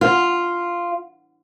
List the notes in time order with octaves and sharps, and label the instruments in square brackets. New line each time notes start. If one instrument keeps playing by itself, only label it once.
[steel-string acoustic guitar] F4